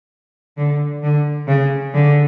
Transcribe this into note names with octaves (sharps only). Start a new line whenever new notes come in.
D3
D3
C#3
D3